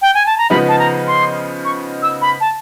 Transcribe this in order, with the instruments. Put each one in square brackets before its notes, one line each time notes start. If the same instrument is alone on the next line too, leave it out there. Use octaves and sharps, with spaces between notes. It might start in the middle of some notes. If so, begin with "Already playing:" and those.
[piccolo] G5
G#5
A5
A#5
[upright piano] C#3 F3 G#3 B3 D#4 [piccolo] B5
[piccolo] A5
A#5
C6
C#6
E6
B5
A5